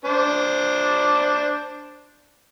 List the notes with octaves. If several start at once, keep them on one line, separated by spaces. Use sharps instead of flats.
D4 C5